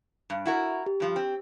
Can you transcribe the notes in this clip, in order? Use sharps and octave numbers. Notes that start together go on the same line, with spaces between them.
G2
E4 F#4 A#4
G4
G2 F3
C4